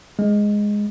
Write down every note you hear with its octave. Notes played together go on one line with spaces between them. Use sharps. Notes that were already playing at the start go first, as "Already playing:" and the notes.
G#3